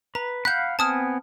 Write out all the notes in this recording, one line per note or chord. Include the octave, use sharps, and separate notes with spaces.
B4 A#5
F5 F#5 B5 F#6 G6
B3 C4 G#5 A5 D#6 F6